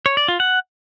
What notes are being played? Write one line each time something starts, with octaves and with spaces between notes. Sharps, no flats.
C#5
D5
F4
F#5